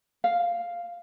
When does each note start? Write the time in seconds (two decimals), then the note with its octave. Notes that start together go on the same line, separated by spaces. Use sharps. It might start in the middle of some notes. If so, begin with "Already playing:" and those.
0.24 F5